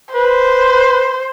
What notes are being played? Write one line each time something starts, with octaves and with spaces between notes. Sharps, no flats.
B4 C5